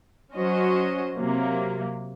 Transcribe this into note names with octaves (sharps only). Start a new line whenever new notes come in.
F#3 C#4 F#4 C5 D#5
C3 F#3 A#3